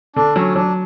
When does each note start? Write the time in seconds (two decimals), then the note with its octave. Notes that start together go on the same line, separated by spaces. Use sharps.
0.16 D3 D4
0.36 F#3 C#4
0.55 F#3 D4